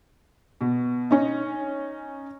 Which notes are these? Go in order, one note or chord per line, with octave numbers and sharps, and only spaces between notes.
B2
C#4 D#4